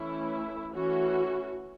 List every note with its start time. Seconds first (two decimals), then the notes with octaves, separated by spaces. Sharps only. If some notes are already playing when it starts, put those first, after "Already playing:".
Already playing: E3 A3 C#4 E4
0.74 E3 A3 C#4 F#4